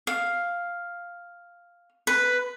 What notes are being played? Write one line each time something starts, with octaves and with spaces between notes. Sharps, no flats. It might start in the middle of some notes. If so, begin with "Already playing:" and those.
F5
B4